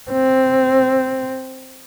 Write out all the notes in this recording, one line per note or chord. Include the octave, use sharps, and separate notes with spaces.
C4